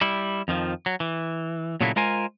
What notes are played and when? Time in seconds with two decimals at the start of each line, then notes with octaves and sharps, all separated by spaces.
0.01 G3 E4
0.48 F2 D#3 F3
0.86 F#3
1.00 E3
1.81 A#2 C#3 F#3 A3 A#3 E4
1.96 G#3 F4 A#4 C5 G#5